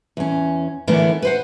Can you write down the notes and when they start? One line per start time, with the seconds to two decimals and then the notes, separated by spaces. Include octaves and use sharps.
0.17 E2 C#4
0.87 D3 E3 A3 B3 A#4 C#5
1.22 B4 C5 F#5